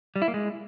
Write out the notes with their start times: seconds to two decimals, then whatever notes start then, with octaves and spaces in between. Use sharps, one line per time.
0.16 G3
0.22 E4
0.28 A#3
0.34 G#3